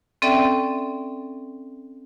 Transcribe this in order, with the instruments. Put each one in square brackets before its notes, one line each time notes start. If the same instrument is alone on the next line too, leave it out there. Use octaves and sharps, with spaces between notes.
[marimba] C4 C#4 A4 D5 E5 G5